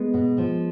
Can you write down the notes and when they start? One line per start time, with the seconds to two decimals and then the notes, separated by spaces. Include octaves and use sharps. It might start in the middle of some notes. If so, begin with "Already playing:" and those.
Already playing: G#3 B3
0.14 B2
0.38 F3